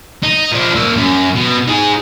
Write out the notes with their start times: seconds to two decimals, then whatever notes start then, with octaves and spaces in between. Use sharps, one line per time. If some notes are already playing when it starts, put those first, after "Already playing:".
0.23 D#4
0.52 F3 D4
0.76 A#3 E5
0.96 F#2
1.35 B2
1.68 D#4 G#4